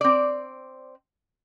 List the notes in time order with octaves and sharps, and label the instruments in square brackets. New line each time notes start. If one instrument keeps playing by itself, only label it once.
[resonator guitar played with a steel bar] C4 D5